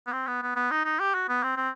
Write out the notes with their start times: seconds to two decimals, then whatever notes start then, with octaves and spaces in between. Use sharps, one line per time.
0.07 B3
0.12 C4
0.27 B3
0.42 B3
0.56 B3
0.71 D#4
0.84 D#4
0.99 G4
1.14 F#4
1.28 B3
1.43 C4
1.56 C4